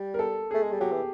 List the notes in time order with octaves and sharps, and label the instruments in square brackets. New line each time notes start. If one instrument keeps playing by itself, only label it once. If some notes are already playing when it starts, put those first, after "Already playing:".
Already playing: [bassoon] G3
[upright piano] A#4
A4
[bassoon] A3 [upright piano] G#4
[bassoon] G#3
G3
[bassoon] F#3 [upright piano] G4
[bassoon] E3